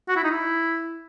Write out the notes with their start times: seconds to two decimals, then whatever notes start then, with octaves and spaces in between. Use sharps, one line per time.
0.09 F#4
0.16 E4
0.24 D#4
0.31 E4